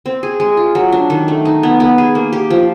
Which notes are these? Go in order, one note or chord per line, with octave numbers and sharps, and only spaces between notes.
C4
G#4
G#3
F4
F#3
D4
D#3
A3
D#4
B3
B3
G#4
A#3
G4
F3